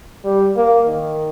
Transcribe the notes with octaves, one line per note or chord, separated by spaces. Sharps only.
G3
A#3
D#3